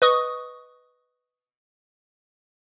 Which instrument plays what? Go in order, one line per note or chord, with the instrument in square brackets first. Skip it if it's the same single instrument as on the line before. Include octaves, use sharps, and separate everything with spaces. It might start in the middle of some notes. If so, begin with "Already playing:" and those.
[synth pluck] B4 D#5 C#6 D#6